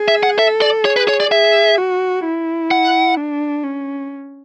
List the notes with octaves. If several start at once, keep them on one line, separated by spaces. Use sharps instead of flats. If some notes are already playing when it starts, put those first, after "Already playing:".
Already playing: G#4
E5
F#5
A4 E5
D5
G#4 C#5
B4
C#5
D5
G#4 E5
F#4
E4
F#5
D4
C#4